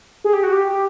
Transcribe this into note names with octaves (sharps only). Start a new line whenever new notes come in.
G#4
G4
F#4
G4